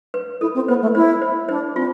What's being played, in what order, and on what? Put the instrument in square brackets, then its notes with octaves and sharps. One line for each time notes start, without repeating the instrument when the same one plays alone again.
[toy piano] B4
[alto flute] E4 [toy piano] A4
[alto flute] C4
[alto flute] B3 [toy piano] C5
[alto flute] A3
[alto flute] E4 [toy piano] C5
[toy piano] C5
[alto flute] D4 [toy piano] C5
[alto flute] C4 [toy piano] F4